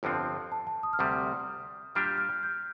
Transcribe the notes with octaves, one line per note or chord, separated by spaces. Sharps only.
G1 F2 D3 F3 C4
A5
A5
D#6
F6
D2 C3 G3 D#6
A#2 G3 D4 G4 F6
G6
F6
G6